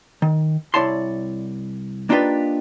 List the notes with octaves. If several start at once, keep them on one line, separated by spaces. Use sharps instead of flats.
D#3
C2 E4 C#5 D5 A5 C6
A#3 D4 D#4 F4 G4 B4